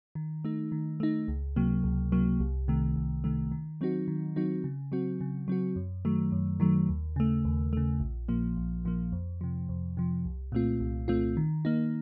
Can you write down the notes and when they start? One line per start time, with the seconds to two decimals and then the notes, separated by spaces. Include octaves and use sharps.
0.15 D#3
0.45 A3 D#4
0.72 D#3
1.00 A3 D#4
1.28 C#2
1.56 C3 F#3 A#3
1.84 C#2
2.12 C3 F#3 A#3
2.40 C2
2.68 C3 D#3 A3
2.96 C2
3.24 C3 D#3 A3
3.52 D#3
3.81 F#3 C4 D#4 F#4
4.08 D#3
4.36 F#3 C4 D#4 F#4
4.64 C#3
4.92 F#3 C4 F#4
5.21 C#3
5.48 F#3 C4 F#4
5.76 F#2
6.05 D#3 F#3 A3
6.32 F#2
6.60 D#3 F#3 A3
6.89 D#2
7.16 C#3 A3
7.45 D#2
7.73 C#3 A3
8.00 A#1
8.28 A#2 F3 A#3
8.57 A#1
8.85 A#2 F3 A#3
9.12 F2
9.41 C3 F3
9.69 F2
9.97 C3 F3
10.25 C2
10.52 A#2 A3 C4 F4
10.80 C2
11.08 A#2 A3 C4 F4
11.37 D#3
11.65 A#3 D#4